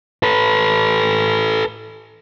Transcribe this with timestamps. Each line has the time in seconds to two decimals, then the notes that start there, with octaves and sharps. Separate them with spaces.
0.23 A4 B4